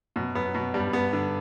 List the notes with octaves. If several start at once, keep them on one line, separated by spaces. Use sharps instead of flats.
F#2 B2
F#2 B3
B2
G2 G3
G2 B3
D3